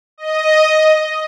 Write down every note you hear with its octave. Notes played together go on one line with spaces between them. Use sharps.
D#5